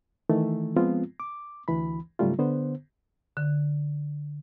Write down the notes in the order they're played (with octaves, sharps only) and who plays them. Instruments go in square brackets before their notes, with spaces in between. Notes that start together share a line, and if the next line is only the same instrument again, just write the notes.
[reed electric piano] D#3 E3 A3
F3 G#3 B3 C4 F4
D6
D2 E3 B5
G#2 C#3 F#3 G3 A3 F4
D3 B3 C5
[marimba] D3